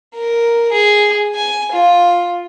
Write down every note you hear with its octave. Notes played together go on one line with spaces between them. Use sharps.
A#4
G#4
G#5
F4